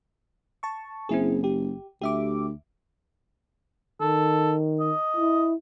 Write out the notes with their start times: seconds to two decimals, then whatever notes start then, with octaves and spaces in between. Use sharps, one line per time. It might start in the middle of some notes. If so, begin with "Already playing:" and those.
0.63 A5 C#6
1.09 F#1 C4 E4 G#4
1.44 G4
2.02 D2 G4 E5 D6
4.01 D#3 A4
4.80 D#5
5.17 E4